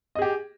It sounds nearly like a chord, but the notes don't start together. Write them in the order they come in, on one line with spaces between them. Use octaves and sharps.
D#5 G#4 G4